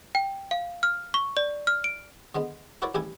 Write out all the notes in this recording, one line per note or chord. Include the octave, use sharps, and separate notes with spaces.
G5
F5
F6
C#6
D5
F6
D7
D3 G#3 B3
E4 F#4 A#4 B4 C#5 D5
A1 G2 G3 D4 E4 G#5